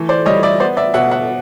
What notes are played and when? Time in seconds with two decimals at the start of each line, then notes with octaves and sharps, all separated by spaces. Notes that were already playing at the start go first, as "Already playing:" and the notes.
Already playing: E3 A3
0.09 C5 D5
0.26 G3 C#5 D#5
0.43 D5 E5
0.60 B3 C5 D5
0.77 D5 E5
0.94 B2 E5 F#5
1.11 E5 F#5